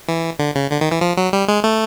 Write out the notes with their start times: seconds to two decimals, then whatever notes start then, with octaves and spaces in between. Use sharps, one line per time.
0.08 E3
0.39 D3
0.55 C#3
0.71 D3
0.81 D#3
0.92 E3
1.01 F3
1.17 F#3
1.33 G3
1.48 G#3
1.64 A3